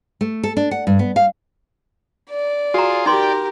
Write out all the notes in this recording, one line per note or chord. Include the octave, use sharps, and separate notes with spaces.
A3
A4
D4
F#5
G2
B3
F5
D5
F4 F#4 G#4 A#5
D#4 G4 A#4 D5 G5 C6 D6